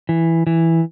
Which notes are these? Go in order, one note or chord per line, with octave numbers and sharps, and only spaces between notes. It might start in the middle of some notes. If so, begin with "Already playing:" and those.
E3
E3